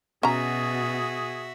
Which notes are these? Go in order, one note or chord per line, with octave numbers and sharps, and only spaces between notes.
B2 C#4 F#4 G#4 E5 A#5